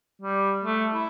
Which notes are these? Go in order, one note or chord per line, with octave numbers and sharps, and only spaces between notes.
G3
A3
E4